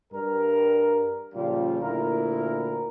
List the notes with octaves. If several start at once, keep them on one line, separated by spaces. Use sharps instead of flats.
G2 G3 A#4
A#2 C#3 F3 G3 F4
D2 A#2 E4 A#4